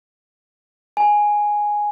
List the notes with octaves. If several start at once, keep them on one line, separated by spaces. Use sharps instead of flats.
G#5